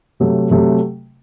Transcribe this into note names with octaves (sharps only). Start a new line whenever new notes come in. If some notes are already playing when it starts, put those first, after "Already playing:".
C3 F#3 A3
C3 F#3 A3